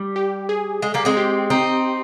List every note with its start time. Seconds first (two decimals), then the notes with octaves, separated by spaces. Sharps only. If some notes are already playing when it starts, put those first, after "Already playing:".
Already playing: G3
0.16 G4
0.49 G#4
0.82 G#3
0.94 G3 A#3
1.05 G#3 C4
1.17 G4
1.50 C4 D#4